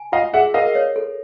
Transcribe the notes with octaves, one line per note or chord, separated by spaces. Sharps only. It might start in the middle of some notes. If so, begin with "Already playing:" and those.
Already playing: G#5
F4 D#5 F5
G#4 E5 F#5
A#4 D#5 F5
C#5
A4